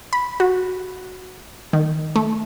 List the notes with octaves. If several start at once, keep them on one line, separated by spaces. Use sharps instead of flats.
B5
F#4
D#3
A3